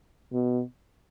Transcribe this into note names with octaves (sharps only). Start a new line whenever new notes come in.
B2